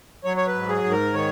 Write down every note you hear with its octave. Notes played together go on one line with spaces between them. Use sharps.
F#3 C#5
C#5
B4
G#2
G#4
G#2
A#4
D#3 C#5